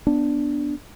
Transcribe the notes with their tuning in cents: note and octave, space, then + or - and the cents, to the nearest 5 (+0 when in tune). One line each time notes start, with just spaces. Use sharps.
B3 +0 D4 +0